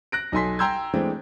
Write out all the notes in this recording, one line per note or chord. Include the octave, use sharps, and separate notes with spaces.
F#6 A#6 D7
B1 D#4 A4 G#5 C6 B6
G5 A#5 C6 E6 G6 G#6
E3 G#3 A3 C4 D4